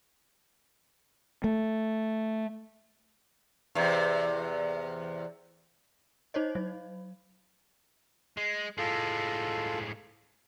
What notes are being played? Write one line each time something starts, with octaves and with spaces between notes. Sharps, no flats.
A3
E2 C3
D#4 C5 C#5 D#5
F#3
G#3
A2 G#3 F4 A4